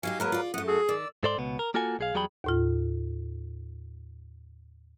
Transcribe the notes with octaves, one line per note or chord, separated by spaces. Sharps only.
F#3 D#4 G4 F5 G#5
E3 F#3 G#3 A#3 A#4 B4
F4 D5
F#2 A3 F#5 D#6
F#4 G#4 A4
D#3 D5 E6
G#2 A4 C5 D5 C6
C#2 B2 B3
A#4
A#3 F4 F#4 A4 G#5
B1 G#4 F5
E2 F#3 G3 G#4 G5 B5
D#2 A2 F4